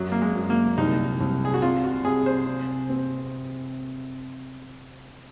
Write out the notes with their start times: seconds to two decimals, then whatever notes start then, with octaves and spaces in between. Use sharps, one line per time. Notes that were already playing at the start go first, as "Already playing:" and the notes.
Already playing: F#2 F#3
0.12 A#3
0.22 G#3
0.35 F#2
0.50 A#3
0.77 C2 D#4
1.21 C2
1.45 G#4
1.54 F#4
1.62 C3 F4
1.84 F#4
2.05 C3 G#4
2.26 C5
2.47 C3
2.89 C4